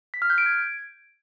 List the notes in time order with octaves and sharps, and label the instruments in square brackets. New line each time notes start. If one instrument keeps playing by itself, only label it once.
[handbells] B6
F6
G6
D7
G#6